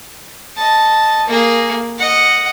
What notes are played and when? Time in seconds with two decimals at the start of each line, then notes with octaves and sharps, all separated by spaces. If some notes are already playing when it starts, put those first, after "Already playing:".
0.57 D#5 A5
1.28 A#3 G#4
1.98 D#5 F#5